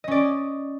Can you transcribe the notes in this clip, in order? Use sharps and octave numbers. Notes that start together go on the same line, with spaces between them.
C#4 D5 D#5